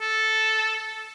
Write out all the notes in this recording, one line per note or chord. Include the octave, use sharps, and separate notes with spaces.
A4